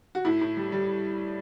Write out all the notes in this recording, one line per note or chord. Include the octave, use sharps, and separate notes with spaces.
F#4
A2 E4
A2
G3
G3